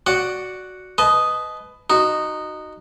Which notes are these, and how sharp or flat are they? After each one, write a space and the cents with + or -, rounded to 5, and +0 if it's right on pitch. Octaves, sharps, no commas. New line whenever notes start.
F#4 +0 D5 +0 F#5 +0
B4 +15 D#5 +0 A5 -35
D#4 -15 F#4 +5